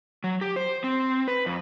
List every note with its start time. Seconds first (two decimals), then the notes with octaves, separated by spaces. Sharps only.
0.24 F#3
0.41 G4
0.56 C5
0.84 C4
1.28 B4
1.46 F2